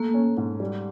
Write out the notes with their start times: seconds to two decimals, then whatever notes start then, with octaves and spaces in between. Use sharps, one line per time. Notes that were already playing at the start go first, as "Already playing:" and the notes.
Already playing: A3 A#3
0.14 C#4
0.37 G#2
0.60 G3